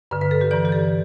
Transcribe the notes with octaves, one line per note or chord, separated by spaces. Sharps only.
G2 D3 B4
B4
A4
G4
G2 E3 D5
G4
A4